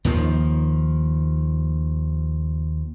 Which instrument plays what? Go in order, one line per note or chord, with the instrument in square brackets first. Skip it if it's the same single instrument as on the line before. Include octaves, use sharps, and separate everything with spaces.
[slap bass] D#2 D#3 F3